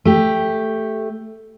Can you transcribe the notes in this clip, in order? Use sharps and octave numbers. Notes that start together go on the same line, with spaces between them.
A3 G4